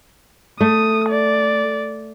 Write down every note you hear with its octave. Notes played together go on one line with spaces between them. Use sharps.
A3 D#6
D5